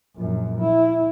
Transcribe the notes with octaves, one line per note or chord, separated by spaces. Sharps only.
A#1 F#2
E4